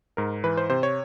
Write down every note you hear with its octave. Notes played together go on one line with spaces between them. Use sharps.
G#2 A#4
E3 B4
C5
C3 C5
C#5